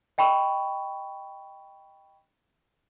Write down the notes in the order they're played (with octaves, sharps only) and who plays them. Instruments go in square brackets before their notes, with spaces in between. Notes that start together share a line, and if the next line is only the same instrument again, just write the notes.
[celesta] D#5 G5 B5 C#6